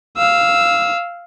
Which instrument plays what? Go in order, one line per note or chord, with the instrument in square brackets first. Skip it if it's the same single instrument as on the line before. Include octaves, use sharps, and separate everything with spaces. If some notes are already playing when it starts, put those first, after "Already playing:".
[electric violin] F5 E6